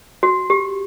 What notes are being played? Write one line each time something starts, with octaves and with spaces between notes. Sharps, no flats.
F#4
G4